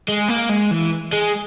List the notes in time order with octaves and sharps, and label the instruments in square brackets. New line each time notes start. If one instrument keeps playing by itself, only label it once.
[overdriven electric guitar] G#3
A#3
G#3
E3
G#3